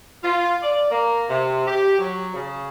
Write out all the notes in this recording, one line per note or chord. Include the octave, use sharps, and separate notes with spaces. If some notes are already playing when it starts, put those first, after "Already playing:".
F4
D5
A#3
C3
G4
F#3
C#3